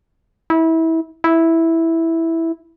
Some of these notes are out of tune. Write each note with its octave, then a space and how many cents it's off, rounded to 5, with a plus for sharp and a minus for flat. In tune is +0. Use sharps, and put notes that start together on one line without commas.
E4 -25
E4 -5